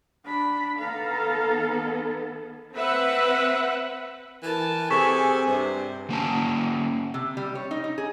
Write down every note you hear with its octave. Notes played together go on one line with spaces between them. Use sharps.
D4 B5
D#3 B3 A4 F5 A#5
C4 B4 E5 F#5
E3 A#4 A5
C3 G#4 A4 G#5 C#6 B6 E7
G2 C3 C5
D3 A#3 C#4 A5
C3
G3
C#5
D#4
D#4
G#4